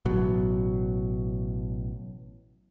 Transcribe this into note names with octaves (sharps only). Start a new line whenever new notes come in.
A1 B2 F#3